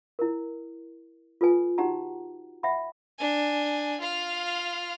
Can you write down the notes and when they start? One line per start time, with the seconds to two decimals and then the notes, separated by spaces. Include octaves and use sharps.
0.19 E4 A#4
1.41 F4 A4 B4 G#5
1.78 D#4 F#4 G4 F#5 A#5
2.63 E5 F#5 B5
3.19 D4 G#5
4.00 F4 F5